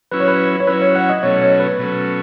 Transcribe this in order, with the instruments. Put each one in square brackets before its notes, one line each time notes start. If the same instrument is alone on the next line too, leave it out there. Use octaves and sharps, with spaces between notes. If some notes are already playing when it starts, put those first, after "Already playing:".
[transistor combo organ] F#3 C#4 E4 [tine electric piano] B4
[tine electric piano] C#5
B4
C#5
[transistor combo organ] F#3 C#4 E4 [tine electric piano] B4
[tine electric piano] C#5
F#5
D#5
[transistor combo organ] B2 F#3 A3 C#4 [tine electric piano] C#5
[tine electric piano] C#5
B4
[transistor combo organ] B2 F#3 A3 C#4